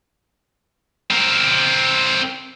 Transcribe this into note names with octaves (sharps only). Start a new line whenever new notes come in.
C4 A#4